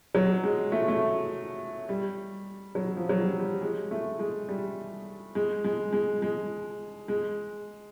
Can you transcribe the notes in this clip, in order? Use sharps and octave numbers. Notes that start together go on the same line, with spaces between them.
F#3
G#3
A3
A3
G3
F#3
F3
F#3
G3
G3
G#3
A3
G#3
G3
G#3
G#3
G#3
G#3
G#3